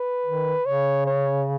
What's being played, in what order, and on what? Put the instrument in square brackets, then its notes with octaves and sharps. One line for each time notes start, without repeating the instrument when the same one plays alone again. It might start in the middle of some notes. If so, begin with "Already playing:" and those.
Already playing: [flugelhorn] B4
[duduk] D#3
[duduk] C#3 [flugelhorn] C#5
[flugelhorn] C#5